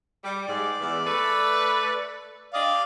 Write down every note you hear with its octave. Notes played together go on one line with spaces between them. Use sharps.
G3 D6
G#2 D5
E2 E3
A3 A4 B4
D4 G4 D5 D#5 F5